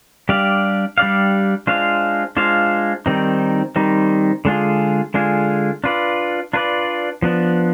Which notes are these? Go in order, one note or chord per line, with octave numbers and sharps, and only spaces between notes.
G3 D4 G4 D5 F5
G3 D4 G4 D5 F5
G#3 D4 F4 C5 F5
G#3 D4 F4 C5 F5
D#3 G3 C4 D#4
D#3 G3 C4 D#4
D3 G#3 D4 F4 G#4
D3 G#3 D4 F4 G#4
D4 F4 B4 D5
D4 F4 B4 D5
F3 B3 D4